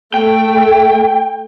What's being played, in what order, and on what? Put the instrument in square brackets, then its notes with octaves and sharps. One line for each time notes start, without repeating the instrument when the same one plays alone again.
[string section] A3 [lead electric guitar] G5